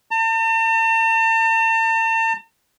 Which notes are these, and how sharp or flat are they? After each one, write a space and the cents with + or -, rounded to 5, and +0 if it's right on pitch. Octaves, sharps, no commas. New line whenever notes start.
A5 +45